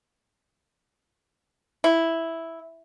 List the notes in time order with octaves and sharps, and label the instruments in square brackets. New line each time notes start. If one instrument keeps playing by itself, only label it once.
[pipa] E4